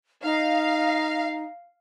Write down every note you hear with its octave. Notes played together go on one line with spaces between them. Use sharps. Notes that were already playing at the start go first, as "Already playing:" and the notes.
D#4 F5